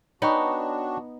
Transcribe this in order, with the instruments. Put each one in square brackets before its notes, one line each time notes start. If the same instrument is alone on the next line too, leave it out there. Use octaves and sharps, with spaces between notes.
[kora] B3 D#4 [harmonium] D4 F#4 [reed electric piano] C#5 G5 C#6